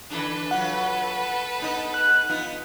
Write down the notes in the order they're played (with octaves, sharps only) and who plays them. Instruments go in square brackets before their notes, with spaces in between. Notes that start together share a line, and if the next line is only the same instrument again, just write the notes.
[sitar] D3 E3 D4 [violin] A4 B4
[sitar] F#3 F4 [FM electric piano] F#5
[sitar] B3 D#4 D#5
[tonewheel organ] F#6
[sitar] B3 D#4 F4